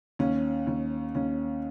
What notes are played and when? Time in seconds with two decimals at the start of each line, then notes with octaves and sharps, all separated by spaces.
0.19 D#2 C#4
0.67 D#2
1.15 D#2 C#4